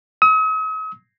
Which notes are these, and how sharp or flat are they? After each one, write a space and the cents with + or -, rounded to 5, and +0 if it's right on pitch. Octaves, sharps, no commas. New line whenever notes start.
D#6 +45